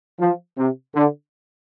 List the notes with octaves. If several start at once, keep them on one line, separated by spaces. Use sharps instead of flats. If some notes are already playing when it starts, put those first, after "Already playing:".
F3
C3
D3